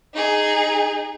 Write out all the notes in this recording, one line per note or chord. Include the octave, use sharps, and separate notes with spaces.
D#4 G#4